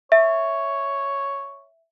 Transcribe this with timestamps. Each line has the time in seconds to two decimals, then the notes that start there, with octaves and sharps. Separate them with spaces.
0.12 C#5 E5